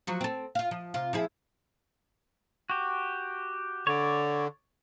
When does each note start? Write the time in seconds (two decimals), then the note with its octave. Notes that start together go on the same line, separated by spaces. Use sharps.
0.07 F3 F#3 F#4
0.21 C4 A4
0.55 F4 F5
0.71 F3
0.94 C3 F4
1.13 F3 E4 G#4
2.70 F#4 G4
3.87 D3 C#5 D5